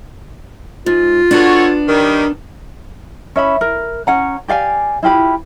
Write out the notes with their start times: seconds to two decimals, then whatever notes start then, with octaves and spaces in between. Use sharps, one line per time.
0.86 G#2 F4
1.31 B3 D4 F#4 A4 C#5
1.87 D#3 G3
3.36 C#4 E5 B5
3.61 A#4
4.07 C#4 F#5 A#5
4.48 G4 D5 F5 G#5
5.03 E4 F4 G4 B5